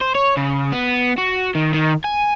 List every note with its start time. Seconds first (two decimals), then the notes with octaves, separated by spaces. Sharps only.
0.01 C5
0.15 C#5
0.37 C#3
0.72 B3
1.18 F#4
1.55 D#3
1.74 D#3
2.04 G#5